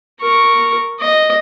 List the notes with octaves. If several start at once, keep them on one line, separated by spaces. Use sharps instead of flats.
A#4 C#6
D#5